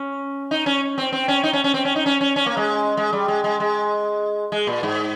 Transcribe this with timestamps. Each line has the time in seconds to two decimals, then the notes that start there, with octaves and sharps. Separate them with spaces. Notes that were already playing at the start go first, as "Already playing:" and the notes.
Already playing: C#4
0.51 D#4
0.66 C#4
0.98 C4
1.12 C4
1.28 C#4
1.44 D#4
1.53 C#4
1.64 C#4
1.74 C4
1.85 C#4
1.96 D#4
2.06 C#4
2.21 C#4
2.36 C#4
2.46 A#3
2.57 G#3
2.97 G#3
3.13 G3
3.28 G#3
3.44 G#3
3.60 G#3
4.52 G#3
4.67 A#2
4.83 G#2